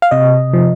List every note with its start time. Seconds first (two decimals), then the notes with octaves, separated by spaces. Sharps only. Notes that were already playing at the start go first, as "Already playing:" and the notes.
0.02 F5
0.11 C3 D#5
0.53 F3